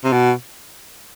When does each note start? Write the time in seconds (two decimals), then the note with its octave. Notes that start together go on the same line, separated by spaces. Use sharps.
0.04 C3
0.12 B2